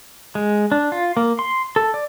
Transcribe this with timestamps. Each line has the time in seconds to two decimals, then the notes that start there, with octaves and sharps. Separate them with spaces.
0.35 G#3
0.72 D4
0.92 F4
1.17 A#3
1.39 C6
1.76 A4
1.94 D5